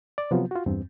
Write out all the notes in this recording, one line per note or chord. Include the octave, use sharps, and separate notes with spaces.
D5
C3 F3 F#3 B3 F4
F4 F#4
E2 G2 C4